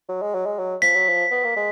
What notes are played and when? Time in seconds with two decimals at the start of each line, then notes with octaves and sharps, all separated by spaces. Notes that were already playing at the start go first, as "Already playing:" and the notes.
0.09 F#3
0.22 G#3
0.35 F#3
0.46 G#3
0.59 F#3
0.82 F3 B6
0.96 F#3
1.09 F3
1.32 B3
1.44 A#3
1.56 G#3